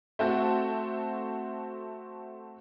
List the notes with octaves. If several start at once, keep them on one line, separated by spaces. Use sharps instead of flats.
A3 C4 F#4